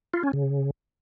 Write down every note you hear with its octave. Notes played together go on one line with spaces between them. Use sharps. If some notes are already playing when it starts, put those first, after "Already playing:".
F4
C#4
C#3